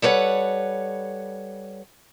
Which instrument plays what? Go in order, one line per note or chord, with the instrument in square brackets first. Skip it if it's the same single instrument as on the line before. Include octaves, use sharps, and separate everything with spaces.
[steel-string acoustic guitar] G3 A4 B4 C#5 F#5